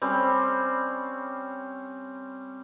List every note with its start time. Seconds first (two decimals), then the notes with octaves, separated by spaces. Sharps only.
0.02 G3 C4 C#4